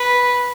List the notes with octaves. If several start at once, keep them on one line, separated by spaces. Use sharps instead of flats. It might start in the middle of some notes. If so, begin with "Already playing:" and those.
Already playing: B4